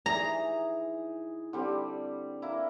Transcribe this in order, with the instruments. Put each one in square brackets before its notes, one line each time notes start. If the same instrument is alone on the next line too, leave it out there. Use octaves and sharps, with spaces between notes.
[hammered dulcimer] E3 D#4 G#4 [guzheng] A#5
[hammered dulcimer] D3 G3 C4
A#3 E4